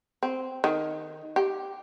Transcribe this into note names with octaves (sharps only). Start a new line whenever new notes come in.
C4
D#3
G4